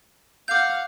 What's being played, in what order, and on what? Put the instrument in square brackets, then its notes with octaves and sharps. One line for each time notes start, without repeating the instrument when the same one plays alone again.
[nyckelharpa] F5 F#5 [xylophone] D6 G6